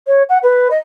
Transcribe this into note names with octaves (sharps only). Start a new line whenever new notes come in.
C#5
F#5
B4
D#5